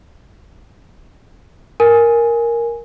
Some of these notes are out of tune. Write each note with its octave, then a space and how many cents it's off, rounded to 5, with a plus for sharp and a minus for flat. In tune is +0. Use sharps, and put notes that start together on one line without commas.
A#4 +0 G#5 +0